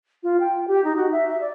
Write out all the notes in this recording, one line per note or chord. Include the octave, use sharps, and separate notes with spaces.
F4
G5
G4
D#4
F#4
E5
E5
D5